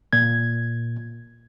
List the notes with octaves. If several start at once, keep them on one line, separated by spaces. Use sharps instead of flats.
A#2 G#6